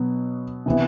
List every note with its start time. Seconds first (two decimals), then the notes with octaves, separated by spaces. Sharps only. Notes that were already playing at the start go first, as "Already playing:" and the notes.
Already playing: B2 F#3 B3
0.66 C3 E3 B3